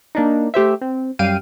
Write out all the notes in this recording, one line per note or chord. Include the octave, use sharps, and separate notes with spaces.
A#3 D4 D#4
A3 G4 C5 E5
C4
F#2 G3 F5 G5 D7 D#7